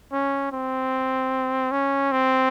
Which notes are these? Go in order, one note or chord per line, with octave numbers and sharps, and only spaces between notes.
C#4
C4
C#4
C4